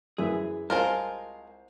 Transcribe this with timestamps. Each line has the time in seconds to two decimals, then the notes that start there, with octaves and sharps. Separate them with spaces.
0.18 F#2 E3 G#4 E5
0.70 C2 G#3 F4 A#4 C5 A5